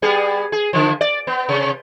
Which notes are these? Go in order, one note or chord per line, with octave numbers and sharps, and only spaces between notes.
G3 B3 G#4
G#4
D3 F3
D5
B3
C3